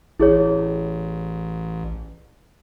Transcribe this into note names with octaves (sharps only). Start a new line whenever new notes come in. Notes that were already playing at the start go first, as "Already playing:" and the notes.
A1 E4 G#4 C#5